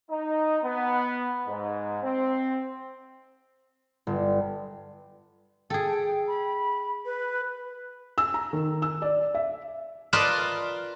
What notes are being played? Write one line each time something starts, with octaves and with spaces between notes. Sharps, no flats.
D#4
B3
G#2
C4
G1
G#4 A4 G5
B5
B4
E6
A#5
D#3
E6
D5
E5
F4 A#4 B4 D5 D#5 A5